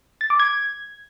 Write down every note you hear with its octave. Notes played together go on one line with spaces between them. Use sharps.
A6
D6
G#6